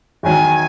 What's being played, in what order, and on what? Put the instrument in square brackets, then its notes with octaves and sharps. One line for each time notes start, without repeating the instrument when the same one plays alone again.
[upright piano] E2 D#3 F#3 [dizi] G#5